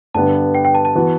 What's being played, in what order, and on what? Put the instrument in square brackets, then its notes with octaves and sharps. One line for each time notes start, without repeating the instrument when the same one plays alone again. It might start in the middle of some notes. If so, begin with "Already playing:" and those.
[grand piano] G2 D3 G3 B3 [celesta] A5
[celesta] G5
G5
A5
A5
[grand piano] E3 B3 F#4